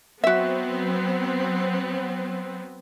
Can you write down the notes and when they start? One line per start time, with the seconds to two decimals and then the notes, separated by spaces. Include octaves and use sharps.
0.24 F#3 B3 C4 F#4 E5